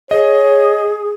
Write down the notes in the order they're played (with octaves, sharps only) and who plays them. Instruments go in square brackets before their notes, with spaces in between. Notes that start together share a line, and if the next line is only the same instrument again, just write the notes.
[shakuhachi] G#4 [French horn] C#5 [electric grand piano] D#5